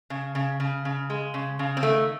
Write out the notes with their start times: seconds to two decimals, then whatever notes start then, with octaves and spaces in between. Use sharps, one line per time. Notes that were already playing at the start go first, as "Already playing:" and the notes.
0.10 C#3
0.35 C#3
0.60 C#3
0.85 C#3
1.10 G#3
1.34 C#3
1.59 C#3
1.77 C4
1.83 D#3 A3